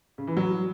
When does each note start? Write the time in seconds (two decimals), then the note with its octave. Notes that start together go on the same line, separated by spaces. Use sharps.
0.18 C#3
0.27 E3
0.37 F#3